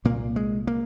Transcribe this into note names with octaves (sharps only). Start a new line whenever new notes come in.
C2 A#2 A#3
G#3
A#3